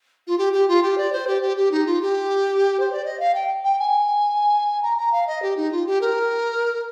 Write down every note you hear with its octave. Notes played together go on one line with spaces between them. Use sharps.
F4
G4
G4
F4
G4
D5
C5
G4
G4
G4
D#4
F4
G4
C5
D5
D#5
F5
G5
G5
G#5
A#5
A#5
F5
D#5
G4
D#4
F4
G4
A#4